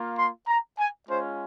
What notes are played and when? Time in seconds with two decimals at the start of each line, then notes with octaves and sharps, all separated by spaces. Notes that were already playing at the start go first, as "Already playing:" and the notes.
Already playing: A#3 F4
0.17 C6
0.47 A#5
0.78 G#5
1.08 G#3 C#4 F4 C5